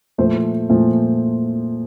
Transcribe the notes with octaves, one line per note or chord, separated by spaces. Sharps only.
A#2 F3 A3 C5
A#2 F3 A3